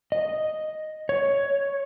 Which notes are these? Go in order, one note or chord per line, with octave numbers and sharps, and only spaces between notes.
D#5
C#5